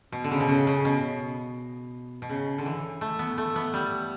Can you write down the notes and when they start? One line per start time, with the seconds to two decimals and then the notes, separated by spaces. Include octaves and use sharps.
0.12 B2
0.24 D3
0.31 C#3
0.40 B2
0.49 C#3
0.67 C#3
0.85 B2
2.22 B2
2.30 C#3
2.58 D3
2.66 E3
3.01 A3
3.19 B3
3.38 A3
3.56 B3
3.74 G3